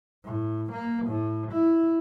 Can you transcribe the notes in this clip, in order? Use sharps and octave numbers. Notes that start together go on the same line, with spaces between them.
A2
A#3
A2
E4